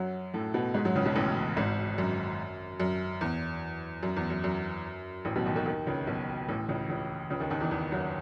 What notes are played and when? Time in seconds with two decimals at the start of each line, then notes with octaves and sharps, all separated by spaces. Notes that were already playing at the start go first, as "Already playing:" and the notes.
Already playing: F#2 F#3
0.34 A2 A3
0.54 B2 B3
0.74 G#2 G#3
0.85 F#2 F#3
0.95 C#2 C#3
1.05 B1 B2
1.16 A1 A2
1.56 G#1 G#2
1.98 F#2
2.80 F#2
3.21 E2
4.03 F#2
4.16 E2
4.30 F#2
4.44 F#2
5.25 A1 A2
5.36 B1 B2
5.46 D#2 D#3
5.56 D#2 D#3
5.66 D#2 D#3
5.87 C#2 C#3
6.07 B1 B2
6.48 A1 A2
6.68 C#2 C#3
6.89 C#2 C#3
7.30 C#2 C#3
7.40 D#2 D#3
7.50 D#2 D#3
7.60 E2 E3
7.71 E2 E3
7.92 F#2 F#3